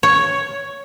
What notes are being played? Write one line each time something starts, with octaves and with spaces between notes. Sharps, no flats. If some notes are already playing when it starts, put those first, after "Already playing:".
C#5